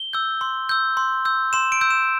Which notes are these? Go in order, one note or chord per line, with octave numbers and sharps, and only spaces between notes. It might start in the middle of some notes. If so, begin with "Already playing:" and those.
Already playing: G7
E6 G6
C6
E6 G6
C6
E6 G6
C6 E7
D7
E6 G6
E7